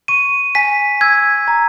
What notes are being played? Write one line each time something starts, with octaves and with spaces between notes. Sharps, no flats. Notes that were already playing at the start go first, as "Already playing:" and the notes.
C#6 D#7
G#5 B6
E6 G#6
A#5